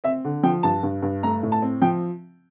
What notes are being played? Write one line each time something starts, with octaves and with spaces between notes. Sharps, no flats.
C4 E5
D3
F3 G5
G2 A5
G2
G2
A3 A#5
A2
A5
C4
F3 G5